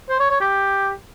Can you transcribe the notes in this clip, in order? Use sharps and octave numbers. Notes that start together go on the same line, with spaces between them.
C5
C#5
C#5
G4